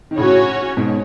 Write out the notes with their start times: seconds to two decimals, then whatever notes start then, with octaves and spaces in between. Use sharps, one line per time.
0.11 D#3
0.17 A2 C#3 C#4 F#4 C#5
0.77 G#2 B2